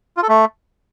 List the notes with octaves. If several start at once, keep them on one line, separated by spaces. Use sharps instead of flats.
F4
A4
A3